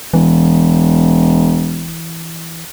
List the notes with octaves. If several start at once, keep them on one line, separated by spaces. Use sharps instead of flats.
E1 E3